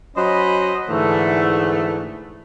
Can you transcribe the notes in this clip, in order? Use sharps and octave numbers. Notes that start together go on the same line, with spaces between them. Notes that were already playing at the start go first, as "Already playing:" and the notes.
F#3 C#4 C5 D#5 B5
G#2 D3 E3 A3